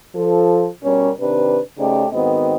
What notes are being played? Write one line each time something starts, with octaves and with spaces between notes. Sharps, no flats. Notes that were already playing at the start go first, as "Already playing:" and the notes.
F3 A4
B2 G3 C#4 A#4 C#5
C3 D#3 D4 B4
C#3 A3 D#4 G4 C5 D5
G#2 D#3 B3 C4 F#4 D#5